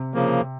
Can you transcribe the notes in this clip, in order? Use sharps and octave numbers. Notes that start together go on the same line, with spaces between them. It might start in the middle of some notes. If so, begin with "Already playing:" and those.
Already playing: C3
C#3 F3 A#3